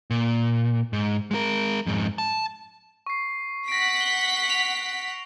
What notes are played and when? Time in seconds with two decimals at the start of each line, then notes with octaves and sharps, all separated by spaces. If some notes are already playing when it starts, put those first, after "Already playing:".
0.10 A#2
0.93 G#2
1.31 G#3 A#4
1.86 F2 G#2
2.18 A5
3.07 C#6 C7
3.68 F#5 A#6 B6 D7
4.01 G7
4.50 F7